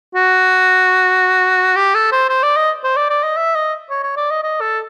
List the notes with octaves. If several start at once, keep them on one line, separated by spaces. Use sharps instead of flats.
F#4
G4
A4
C5
C5
D5
D#5
C5
D5
D5
D#5
E5
D#5
C#5
C#5
D5
D#5
D#5
A4